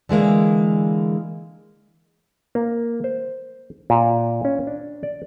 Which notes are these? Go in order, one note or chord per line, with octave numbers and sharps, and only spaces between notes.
D3 E3 G#3 A#3
A#3
C5
A#2
C#4
D4
D5